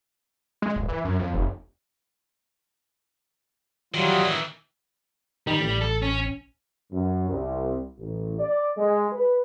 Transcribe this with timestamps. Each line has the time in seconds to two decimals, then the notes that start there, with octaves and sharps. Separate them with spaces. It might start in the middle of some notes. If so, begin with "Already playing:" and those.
0.62 G#3
0.76 D1
0.89 E3
1.05 F#2
1.19 F2
1.34 F1
3.94 D#3 E3 F#3 G3 F4
5.47 D#3 G3
5.60 A1
5.81 A4
6.02 C#4
6.91 F#2
7.29 C2
7.98 A1
8.39 D5
8.77 G#3
9.12 B4